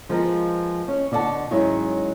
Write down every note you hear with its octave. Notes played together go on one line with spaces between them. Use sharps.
F3 G#3 B3 A#4
C#4
B2 D3 D5 E5 F#5 A5
G#2 D#3 F#3 G#3 C#4 E4